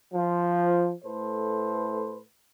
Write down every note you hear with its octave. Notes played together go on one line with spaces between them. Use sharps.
F3
A2 A3 A4 B4 C5